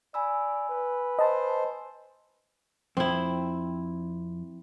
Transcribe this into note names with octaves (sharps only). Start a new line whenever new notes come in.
D5 G#5 B5 E6
B4
C5 D#5 A5
F2 C4 E4